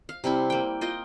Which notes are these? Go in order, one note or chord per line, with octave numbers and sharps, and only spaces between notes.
F5
C3 G3 C4 E4
A#3 G5
F4 D#5 G5